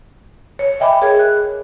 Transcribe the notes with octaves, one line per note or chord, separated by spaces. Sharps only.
C#5
D#5 E5 G5 G#5 B5 D6
G#4 A#4 C#5 G#6
F#6